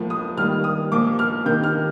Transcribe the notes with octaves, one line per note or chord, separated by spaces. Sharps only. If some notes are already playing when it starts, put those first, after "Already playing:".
Already playing: A2 F3 A#3
D#6
D#3 G3 A#3 F6
D#6
A#2 F3 A#3 D6
F6
C3 D#3 A#3 G6
F6